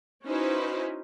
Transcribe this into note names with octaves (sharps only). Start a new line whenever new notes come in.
C#4 D#4 E4 F#4 B4 C5